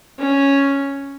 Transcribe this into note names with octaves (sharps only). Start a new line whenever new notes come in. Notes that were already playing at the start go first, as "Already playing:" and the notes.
C#4